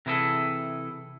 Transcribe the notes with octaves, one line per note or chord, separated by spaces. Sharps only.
C3 E3 E4 G#4 A4